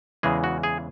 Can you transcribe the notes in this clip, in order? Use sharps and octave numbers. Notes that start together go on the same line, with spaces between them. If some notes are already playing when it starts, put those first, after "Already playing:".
E2 C#3 E3 G#3 G#4
F#4
G#4